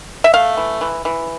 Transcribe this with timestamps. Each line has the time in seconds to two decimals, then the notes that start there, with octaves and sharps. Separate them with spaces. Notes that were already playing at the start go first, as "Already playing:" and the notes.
0.24 E5
0.34 A3 F5
0.57 E3
0.81 E3
1.05 E3